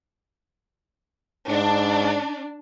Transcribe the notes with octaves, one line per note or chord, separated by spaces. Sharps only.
G#2 D4